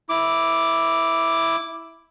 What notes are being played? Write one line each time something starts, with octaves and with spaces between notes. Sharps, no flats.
E4 D6